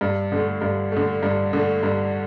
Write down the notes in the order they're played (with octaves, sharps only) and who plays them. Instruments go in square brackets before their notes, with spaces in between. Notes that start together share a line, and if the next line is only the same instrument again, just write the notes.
[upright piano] G2
D3 A3
G2
D3 A3
G2
D3 A3
G2